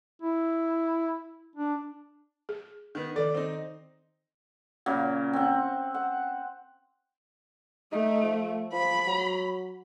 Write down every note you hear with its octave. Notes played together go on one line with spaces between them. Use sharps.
E4
D4
G#4
D#3 B3
D#3 A4 D5
C4 D#4
A#2 C#3 F#3
C4 F#5
F#5
A3 D#4
F3
F3 B5
F#3